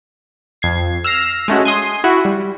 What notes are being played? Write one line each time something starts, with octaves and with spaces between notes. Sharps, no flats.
F2 G#6 C7
E6 F6 A#6 C7
G#3 A3 C#4 F#4
G#5 C6 D#6
E4 F#4 E5
G3